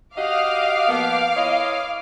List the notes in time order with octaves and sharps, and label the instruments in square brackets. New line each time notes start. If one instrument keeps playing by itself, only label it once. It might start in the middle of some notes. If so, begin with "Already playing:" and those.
[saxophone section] F#4 G4 D#5 [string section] F5 D6
[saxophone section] F3 A#3 B3
E4 C#5 D#5